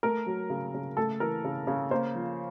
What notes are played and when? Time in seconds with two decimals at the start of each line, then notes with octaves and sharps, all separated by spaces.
0.03 A3 A#4
0.26 F#3
0.50 C#3
0.74 C#3
0.97 A3 A4
1.20 E3 A#4
1.45 C#3
1.67 C#3
1.91 A#3 C5
2.15 F3